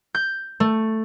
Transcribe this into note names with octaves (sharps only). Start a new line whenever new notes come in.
G6
A3